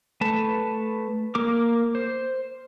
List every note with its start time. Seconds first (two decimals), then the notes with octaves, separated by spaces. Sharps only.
0.21 A3 B4 A5
1.35 A#3 A#4 D6
1.95 C5